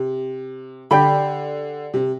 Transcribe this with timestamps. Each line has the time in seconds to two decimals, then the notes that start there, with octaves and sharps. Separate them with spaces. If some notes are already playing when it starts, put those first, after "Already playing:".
Already playing: C3
0.91 D3 G4 D5 G5 B5
1.94 C3